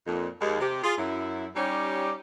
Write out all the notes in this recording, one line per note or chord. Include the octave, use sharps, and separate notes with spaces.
F2 A#2 D#4
D#2 G#3
C3 G4
F4 G#4
F#2 E4
G3 C#4 D#4 G4 C#5 D5